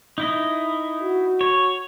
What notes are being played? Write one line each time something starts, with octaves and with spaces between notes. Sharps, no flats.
D#4 E4 D#5
F#4
C#5